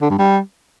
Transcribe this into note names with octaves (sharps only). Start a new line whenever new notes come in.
D3
G2
G3